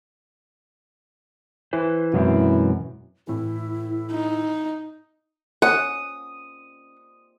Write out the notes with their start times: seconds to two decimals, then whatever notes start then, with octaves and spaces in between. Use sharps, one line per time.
1.73 E3 B4 C5
2.14 F#2 B2 G#3 C4 E4
3.27 A2 E3 E4
4.12 D#4
5.62 C#4 F#5 D#6